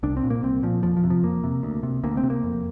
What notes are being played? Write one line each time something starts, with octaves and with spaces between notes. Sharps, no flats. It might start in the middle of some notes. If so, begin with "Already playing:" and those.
C2 D4
C4
A#2
A#3
C2 C4
A#2 F3
F2 F3
F3
C3
F3
F2 A#3
C3
D2
C3
D2 A#3
C4
C3
A#3
F2